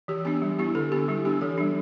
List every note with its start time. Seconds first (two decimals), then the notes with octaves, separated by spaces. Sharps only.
0.08 E3 G4
0.25 B3 D4 G4
0.42 G3
0.59 B3 E4 G4
0.75 D3 A4
0.92 B3 D4 G4
1.08 G3 E4
1.25 B3 D4 G4
1.41 E3 A4
1.58 G3 D4